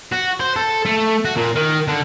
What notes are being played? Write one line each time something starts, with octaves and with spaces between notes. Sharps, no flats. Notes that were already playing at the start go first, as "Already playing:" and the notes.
F#4
C5
A4
A3
F#4
A#2
D#3
D3